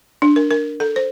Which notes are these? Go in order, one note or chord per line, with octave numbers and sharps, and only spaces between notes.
D4
A#4
A#4
A4
C5